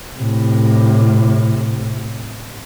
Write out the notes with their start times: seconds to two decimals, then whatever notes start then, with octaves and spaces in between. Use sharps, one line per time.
0.17 A2 C3